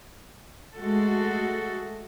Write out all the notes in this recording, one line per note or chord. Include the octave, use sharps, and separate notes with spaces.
G#3 A3 F#4 A4